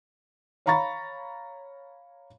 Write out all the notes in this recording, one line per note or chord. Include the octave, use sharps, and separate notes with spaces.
C#5 F5 A#5 B5 C#6 A6